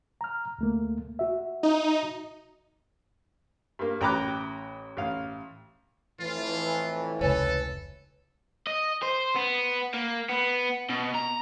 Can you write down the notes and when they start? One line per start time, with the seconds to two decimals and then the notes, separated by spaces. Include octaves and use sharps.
0.21 A#5 F6
0.59 D2 A3 A#3
1.19 F#4 E5
1.63 D#4
3.79 G2 A#3
4.01 A1 G5 A#5 B5 D6 F#6
4.97 A1 F5
6.20 F2 A2 E3 F4
7.21 F1 C#2 A4 B4 C#5 G#5
8.67 D#5
9.02 C5
9.35 B3
9.94 A#3
10.29 B3
10.89 B2
11.14 A#5